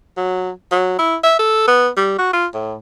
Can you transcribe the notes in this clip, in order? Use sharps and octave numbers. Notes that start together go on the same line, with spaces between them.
F#3
F#3
E4
E5
A4
B3
G3
F#4
F4
A2